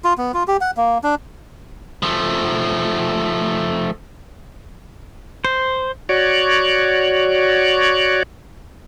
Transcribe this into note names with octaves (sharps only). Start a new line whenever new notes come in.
F4
B3
F4
G4
F#5
A#3
D4
F3 A3
C5
F#4 C#5 D5